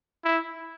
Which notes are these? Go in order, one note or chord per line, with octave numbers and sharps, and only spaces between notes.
E4